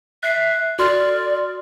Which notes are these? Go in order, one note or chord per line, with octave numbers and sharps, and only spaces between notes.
E5 F#6 C7
F#4 D5 C6 F6